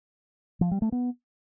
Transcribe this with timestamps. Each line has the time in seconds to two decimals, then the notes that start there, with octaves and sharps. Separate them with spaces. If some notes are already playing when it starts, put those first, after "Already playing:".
0.61 F3
0.71 G3
0.82 A3
0.92 B3